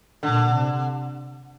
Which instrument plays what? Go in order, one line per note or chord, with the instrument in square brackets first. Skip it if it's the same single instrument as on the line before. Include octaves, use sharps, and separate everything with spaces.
[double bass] A#2 [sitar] D3
[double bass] C3